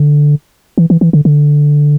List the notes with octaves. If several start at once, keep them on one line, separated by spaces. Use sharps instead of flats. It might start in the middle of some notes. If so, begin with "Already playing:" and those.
Already playing: D3
E3
E3
E3
D3
D3